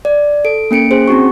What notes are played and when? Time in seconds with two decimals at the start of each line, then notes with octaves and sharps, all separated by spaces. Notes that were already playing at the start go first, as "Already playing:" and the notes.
0.05 D5
0.45 A4 D7
0.71 A#3 C#4 C#7 D7
0.91 C#4 G#4 C5
1.08 C4 D#4 F#4 C#6